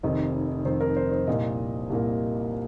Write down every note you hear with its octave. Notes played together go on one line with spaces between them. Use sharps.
F1 F2 D#3 C4 D#5
F1 F2 D#3 C4 C5
A#4
C5
C5
C2 A#2 A#3 D#5
C2 A#2 A#3